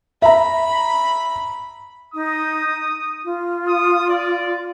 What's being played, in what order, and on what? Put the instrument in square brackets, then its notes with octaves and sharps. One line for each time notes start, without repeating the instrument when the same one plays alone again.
[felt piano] E5 A#5 [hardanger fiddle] B5
[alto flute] D#4 [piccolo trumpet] D#6
[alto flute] F4
[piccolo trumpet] D#6
D5